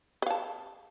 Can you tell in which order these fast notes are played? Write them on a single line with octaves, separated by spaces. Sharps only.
B4 F5 A5